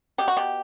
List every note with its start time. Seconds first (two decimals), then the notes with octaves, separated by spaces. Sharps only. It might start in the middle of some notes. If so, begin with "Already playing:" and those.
0.18 B2 G4
0.28 F#4
0.37 B2 G4